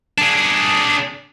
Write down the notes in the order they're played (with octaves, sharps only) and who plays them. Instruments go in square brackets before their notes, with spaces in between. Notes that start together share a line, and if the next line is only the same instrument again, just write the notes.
[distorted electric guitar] D4 G#4